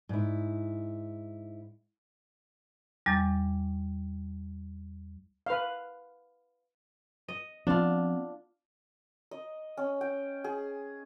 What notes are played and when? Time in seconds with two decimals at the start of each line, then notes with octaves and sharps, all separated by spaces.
0.09 G#2 E4
3.06 E2 G3 D6 A6
5.46 B4 F5
7.28 D#5
7.67 F3 B3 C4 D4 F4
9.31 D#5
9.77 C#4
10.01 G5
10.44 G#4